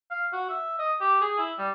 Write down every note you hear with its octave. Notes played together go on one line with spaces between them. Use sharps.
F5
F#4
E5
D#5
G4
G#4
E4
G3